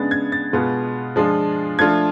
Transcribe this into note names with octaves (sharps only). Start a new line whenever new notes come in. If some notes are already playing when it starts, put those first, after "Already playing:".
Already playing: C#3 G#3 B3 D4 A6
G#6
A6
B2 G#3 B3 F4
F3 G#3 D4 F4
F3 A3 D4 F4 G#6